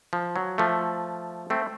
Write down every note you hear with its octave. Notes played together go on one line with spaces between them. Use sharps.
F3
F#3
F3 A3
A3 C4